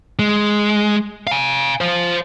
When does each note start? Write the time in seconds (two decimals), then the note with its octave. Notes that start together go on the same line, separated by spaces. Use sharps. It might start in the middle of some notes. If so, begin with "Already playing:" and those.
0.19 G#3
1.27 F5 G#5
1.81 C5 F5